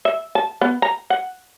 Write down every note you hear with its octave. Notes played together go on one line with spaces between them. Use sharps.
E5
A5
B3
A#5
F#5